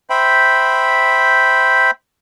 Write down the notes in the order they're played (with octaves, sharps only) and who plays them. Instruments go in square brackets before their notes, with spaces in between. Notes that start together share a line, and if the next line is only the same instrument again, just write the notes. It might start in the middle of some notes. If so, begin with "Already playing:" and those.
[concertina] C5 E5 G5 B5